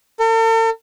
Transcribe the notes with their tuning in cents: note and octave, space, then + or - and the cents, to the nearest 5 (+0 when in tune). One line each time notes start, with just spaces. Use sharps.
A4 +45